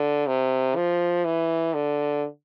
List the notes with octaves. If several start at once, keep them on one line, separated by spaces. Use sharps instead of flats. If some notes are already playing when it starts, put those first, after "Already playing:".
Already playing: D3
C3
F3
E3
D3